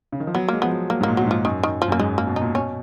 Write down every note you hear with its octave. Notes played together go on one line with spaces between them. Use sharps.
C#3
D#3
F3
F#3 B3
G#3 A#3
F3 B3
F#3
F#3 A#3
G#2
A#2 A#3
A#2 F#3
G#2 F3
F#2 D#3
D#3
F3
F#2 A#3
G#2 G#3
A#3
B2
D#4
A#2
B2 C#4